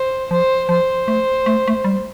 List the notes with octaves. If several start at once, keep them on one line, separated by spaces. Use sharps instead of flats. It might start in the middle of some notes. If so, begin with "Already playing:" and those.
Already playing: C5
F3 C5
F3 C5
A3
A3
A3
G3